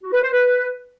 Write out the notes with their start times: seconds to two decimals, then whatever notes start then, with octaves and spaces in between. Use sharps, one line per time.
0.02 F#4
0.12 B4
0.22 C5
0.33 B4